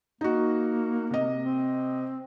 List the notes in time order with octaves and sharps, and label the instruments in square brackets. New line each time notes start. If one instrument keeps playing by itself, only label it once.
[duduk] A#3 [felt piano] D#4 F#4
[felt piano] C3 D#5
[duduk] C4